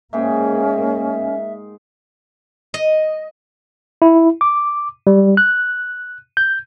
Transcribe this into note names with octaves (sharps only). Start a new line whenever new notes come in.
G#2 A#3 C#4 G#4 E5 G5
D#5
E4
D6
G3
F#6
G6